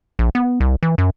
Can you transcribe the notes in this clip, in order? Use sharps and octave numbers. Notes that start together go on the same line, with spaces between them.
A#1
B3
C2
E3
F#2